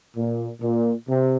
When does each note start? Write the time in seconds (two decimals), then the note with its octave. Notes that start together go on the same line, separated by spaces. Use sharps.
0.16 A#2
0.61 A#2
1.07 C3